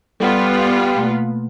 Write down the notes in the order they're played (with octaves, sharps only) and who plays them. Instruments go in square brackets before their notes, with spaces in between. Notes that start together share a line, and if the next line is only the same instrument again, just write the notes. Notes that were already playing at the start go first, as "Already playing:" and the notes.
[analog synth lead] G3 [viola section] B3 F4 B4 [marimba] A4 F#5 G5
[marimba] B2 A3 A#3